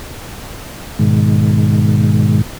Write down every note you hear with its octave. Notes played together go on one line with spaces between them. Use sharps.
G#2 B2 D#3 G#3